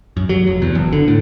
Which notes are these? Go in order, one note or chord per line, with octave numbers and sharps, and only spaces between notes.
F#2
F#3
F1
E2
F#1
D3
A2